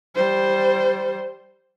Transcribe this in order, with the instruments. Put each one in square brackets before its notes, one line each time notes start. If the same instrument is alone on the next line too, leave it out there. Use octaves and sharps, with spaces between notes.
[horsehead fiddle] G3 C5